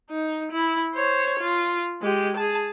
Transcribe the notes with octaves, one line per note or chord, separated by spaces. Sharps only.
D#4
E4
C5 C#5
F4
G#3 G4
G#4 A5